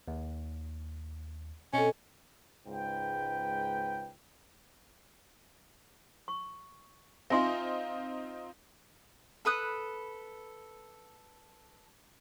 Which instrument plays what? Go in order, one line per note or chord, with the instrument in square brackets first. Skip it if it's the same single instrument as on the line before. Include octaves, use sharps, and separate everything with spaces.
[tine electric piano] D#2
[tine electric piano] B2 C4 [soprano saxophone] C#4 [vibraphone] A4 D#5
[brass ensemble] C#2 G#2 B4 G5
[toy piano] C#6
[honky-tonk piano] C4 D#4 F4 [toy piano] E5 G#5 C6
[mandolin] A4 B4 D#6 F#6